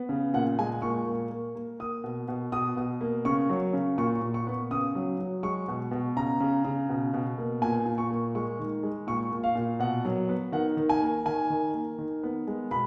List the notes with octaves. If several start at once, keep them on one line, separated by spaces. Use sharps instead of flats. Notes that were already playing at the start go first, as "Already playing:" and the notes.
Already playing: B3
C#3
A#2 F#5
G#3 G#5
A#2 C#6
A#3
A#3
A#3
A#3 D#6
B2
B2
B2 D#6
B2
A#3
C#3 C#6
F#3
C#3
A#2 C#6
A#2
C#6
B3
C#3 D#6
F#3
F#3
G#3 C#6
B2
B2
C#3 A#5
C#3
C#3
B2
B2
A#3
A#2 G#5
A#2
C#6
A#3
G#3 C#6
D#3
G#3
A#2 C#6
A#2
F5
A#2
B2 F#5
F#3
B3
D#3 F#5
D#3
G#5
A#3
D#3 G#5
D#3
A#3
D#3
B3
G#3
B2 B5